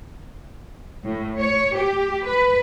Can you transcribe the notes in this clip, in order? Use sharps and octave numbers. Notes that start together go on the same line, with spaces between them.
A2
C#5
G4
B4